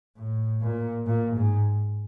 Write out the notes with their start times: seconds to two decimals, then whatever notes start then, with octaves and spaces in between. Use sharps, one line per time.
0.17 A2
0.62 A#2
1.06 A#2
1.36 G#2